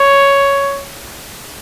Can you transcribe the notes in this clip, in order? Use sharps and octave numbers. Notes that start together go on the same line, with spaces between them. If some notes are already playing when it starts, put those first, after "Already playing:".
Already playing: C#5